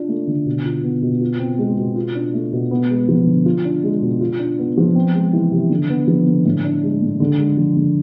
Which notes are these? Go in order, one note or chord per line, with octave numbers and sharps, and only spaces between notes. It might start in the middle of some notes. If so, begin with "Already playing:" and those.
Already playing: D4 F4
A3
D3
B2
F4
B3
B2
F4
C4
G#3
B2
F4
D4
A3
B2
B3
G#3
F3
D3
F4
D4
G#3
B2
F4
D4
B3
F3
C4
G#3
E3
C3
D3
B3
F3
D3
A2
D4
G#3
A2
D3
G#3
F3
D3